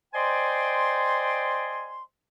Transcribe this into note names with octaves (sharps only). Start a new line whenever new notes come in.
C5 D5 D#5 G5 G#5 C6